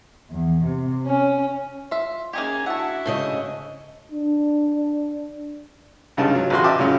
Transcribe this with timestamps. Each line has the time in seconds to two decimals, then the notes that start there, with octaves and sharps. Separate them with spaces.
0.29 E2
0.65 C3
1.05 C#4
1.91 F4 E5
2.33 A#3 C#4 D#4 G4 G#4 G#5
2.66 D4 E4 F#4 E5 F#5 A5
3.06 G#2 C#3 A3 D#5
4.12 D4
6.17 C#2 G2 C#3 D#4 A5
6.35 F#3
6.50 A1 C#3 F#4 C6
6.64 D#5 E5 G5 A5 D6
6.79 F#2 A#2 C#3